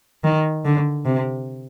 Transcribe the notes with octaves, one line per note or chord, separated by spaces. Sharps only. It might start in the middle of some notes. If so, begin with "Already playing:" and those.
D#3
D3
C3